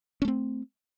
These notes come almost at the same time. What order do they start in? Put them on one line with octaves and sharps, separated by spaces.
C#4 A3 C4